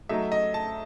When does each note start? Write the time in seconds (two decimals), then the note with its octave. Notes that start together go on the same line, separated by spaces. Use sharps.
0.09 F#3 A3 D#4 E5
0.32 D#5
0.54 A5